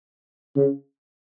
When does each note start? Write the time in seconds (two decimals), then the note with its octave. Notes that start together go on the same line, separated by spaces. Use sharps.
0.56 C#3